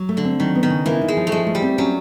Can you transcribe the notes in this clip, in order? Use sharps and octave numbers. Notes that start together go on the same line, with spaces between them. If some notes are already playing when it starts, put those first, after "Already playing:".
Already playing: F#3
A3
D3
C4
D#3 F#3
B3
D#3
C#3
E3 A#3
D#4
G#3
F3
A3
F3 G#3
A3
G3
C4
F#3 C#4